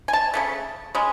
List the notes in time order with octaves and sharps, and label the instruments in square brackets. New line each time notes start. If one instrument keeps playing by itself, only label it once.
[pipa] G#5
A5
C#3 F#3 A3
C#3 G#3